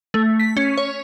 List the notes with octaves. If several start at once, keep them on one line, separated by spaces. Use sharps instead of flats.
A3
B6
C#4
C#5